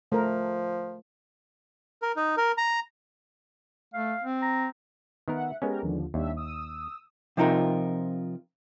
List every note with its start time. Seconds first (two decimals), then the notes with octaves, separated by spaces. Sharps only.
0.12 F3 A3 A#4
2.02 A#4
2.16 D#4
2.37 A#4
2.58 A#5
3.94 A3 F5
4.23 C4
4.42 A#5
5.28 D#3 B3 A#4 E5 F#5
5.62 G#3 B3 C#4 G4 A#4
5.82 D#2 D3 F3
6.14 D#2 G3 D4 E5
6.37 D#6 E6
7.37 C3 F3 C4 D#4 F4 A#4